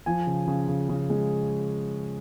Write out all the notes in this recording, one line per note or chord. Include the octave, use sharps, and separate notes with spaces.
F3 G#5
C#3
C#3
C#3
C#3
G#3